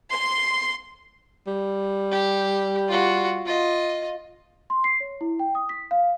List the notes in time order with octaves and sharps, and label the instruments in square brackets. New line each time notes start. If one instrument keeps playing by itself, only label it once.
[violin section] C6
[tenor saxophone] G3
[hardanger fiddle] G4
F4 F#4
F4 D#5
[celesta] C6
C7
C#5
E4
G5
D#6
B6
F5